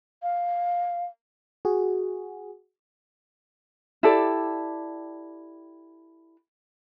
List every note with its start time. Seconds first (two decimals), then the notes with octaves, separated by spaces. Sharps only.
0.23 F5
1.65 F#4 G#4
4.03 E4 G4 A4 D5